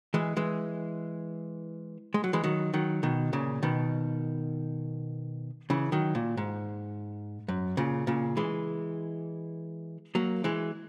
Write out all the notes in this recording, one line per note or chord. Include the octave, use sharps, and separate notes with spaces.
E3 G#3
E3 G#3
G#3
F#3
E3 G#3
D#3 F#3
D#3 F#3
B2 D#3
A#2 C#3
B2 D#3
C#3 E3
D#3 F#3
A#2
G#2
F#2
A#2 C#3
A#2 C#3
E3 G#3
F#3 A#3
E3 G#3